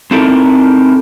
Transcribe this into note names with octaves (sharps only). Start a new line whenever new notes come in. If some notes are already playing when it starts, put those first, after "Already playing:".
C4 D#4 E4 G4 A4 A#4